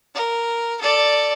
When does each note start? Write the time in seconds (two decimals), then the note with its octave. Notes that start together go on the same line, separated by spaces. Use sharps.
0.15 A#4
0.81 A4 D5